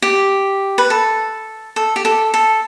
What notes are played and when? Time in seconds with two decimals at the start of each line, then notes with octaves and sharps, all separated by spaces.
0.02 G4
0.78 B4
0.90 A4
1.76 A4
1.96 G4
2.05 A4
2.34 A4